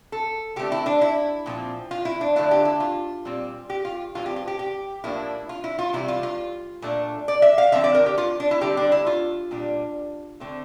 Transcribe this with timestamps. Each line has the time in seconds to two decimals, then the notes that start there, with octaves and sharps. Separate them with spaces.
0.12 A4
0.56 D3 A3 C4 G4
0.72 E4
0.86 D4
1.01 E4
1.46 A#2 F3 C4
1.91 F4
2.05 E4
2.21 D4
2.36 D3 F3 A3 D4 E4
2.51 G4
2.65 E4
2.80 F4
3.25 A#2 G3 C4
3.70 G4
3.85 F4
4.15 A2 E3 G3 C4 F4
4.26 G4
4.36 F4
4.47 G4
4.59 G4
5.04 A2 F3 A#3 D4 E4
5.49 F4
5.64 E4
5.79 F4
5.93 C3 E3 G3 E4
6.08 F4
6.23 F4
6.82 A#2 A3 D4
7.28 D5
7.42 E5
7.58 F5
7.72 D3 F3 C4 E5
7.84 D5
7.95 A#4
8.06 G4
8.18 F4
8.40 D4
8.51 E4
8.61 D3 G3 C4 G4
8.77 D4
8.92 E4
9.07 F4
9.51 A#2 G3 D4
10.40 D3 A3 C4